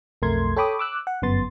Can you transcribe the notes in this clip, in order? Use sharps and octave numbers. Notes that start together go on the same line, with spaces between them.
B1 F2 A3 A#4 C6 G#6
A4 C#5 G5 B5 D6 D#6
D6 E6 F#6
F#5
G1 F#2 B3 C6 A6